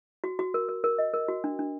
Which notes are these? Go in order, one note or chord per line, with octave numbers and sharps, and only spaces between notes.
F#4
F#4
A#4
A#4
A#4
D#5
A#4
F#4
D4
D4